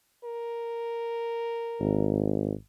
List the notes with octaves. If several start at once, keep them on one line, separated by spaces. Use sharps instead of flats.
A#4
G#1